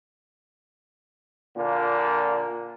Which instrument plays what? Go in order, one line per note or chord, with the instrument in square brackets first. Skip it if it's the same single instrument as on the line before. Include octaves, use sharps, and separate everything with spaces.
[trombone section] A#2 D3 A#3